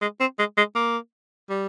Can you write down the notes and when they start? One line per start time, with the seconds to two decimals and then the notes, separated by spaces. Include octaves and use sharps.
0.02 G#3
0.20 C4
0.39 G#3
0.57 G#3
0.75 A#3
1.50 G3